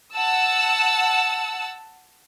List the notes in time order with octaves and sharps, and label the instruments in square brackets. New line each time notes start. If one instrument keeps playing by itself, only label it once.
[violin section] F#5 A5 E6